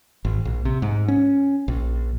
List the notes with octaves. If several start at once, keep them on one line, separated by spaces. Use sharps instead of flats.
G#1
A#1
C3
G#2
C#4
A#1